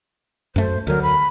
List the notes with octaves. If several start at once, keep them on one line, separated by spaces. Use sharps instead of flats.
F#2 A3 C5
D2 F#3 A#4
B5